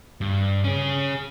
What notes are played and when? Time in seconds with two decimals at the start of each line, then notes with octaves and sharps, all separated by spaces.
0.21 G2
0.64 C#4 G#4